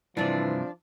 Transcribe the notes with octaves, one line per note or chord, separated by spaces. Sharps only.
G2 C3 E3 F3 D4 D5